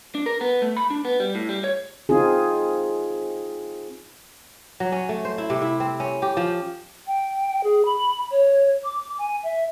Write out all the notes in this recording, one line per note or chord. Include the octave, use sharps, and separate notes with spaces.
D4
A#4
B3
A3
B5
D4
B3
G3
A2
G3
C#5
C4 D#4 F4 G#4
F#3
C#4
A3
C5
E4
C3
E4
C4
C#4
G4
F3
G5
G#4
B5
C#5
D6
G#5
E5